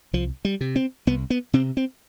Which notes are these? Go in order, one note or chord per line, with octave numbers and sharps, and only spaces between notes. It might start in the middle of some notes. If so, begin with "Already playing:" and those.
C2 F3
G3
C3
C4
C2 B3
B3
C3 C4
C4